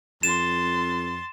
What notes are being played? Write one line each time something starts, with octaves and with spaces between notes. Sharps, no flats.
F2 C6 A6 E7